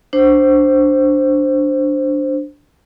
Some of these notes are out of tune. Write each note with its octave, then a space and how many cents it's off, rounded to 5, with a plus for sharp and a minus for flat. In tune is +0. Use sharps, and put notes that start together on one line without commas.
D4 +0 C5 +0